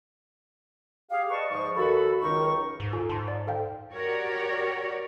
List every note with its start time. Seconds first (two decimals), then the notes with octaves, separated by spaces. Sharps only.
1.11 G4 G#4 F5
1.30 B4 D5 D#5 A5 C#6
1.49 G#2 F3 C#6
1.75 D#2 F#4 A4 B5
2.21 C#2 F#2 D#3 D#4 A#4 C#6
2.80 G#2
2.93 F4 A4 G#5
3.09 G#2 A5 C6
3.28 D5
3.47 A4 F5 G5
3.93 F#4 G4 A#4 C#5 D5